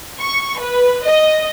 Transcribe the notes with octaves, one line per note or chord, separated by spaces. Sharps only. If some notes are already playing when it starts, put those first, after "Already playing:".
C#6
B4
D#5